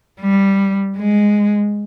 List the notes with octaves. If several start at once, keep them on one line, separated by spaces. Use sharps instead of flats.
G3
G#3